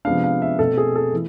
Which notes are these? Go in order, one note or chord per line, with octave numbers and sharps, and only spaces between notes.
C3 F3 G#3 B3 D4 F5
F5
E5
B2 A3 C4 A4
G#4
A4
E3 A3